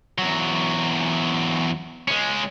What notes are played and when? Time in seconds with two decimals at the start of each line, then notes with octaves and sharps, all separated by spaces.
0.18 E2 F#3
2.08 G#3 C#4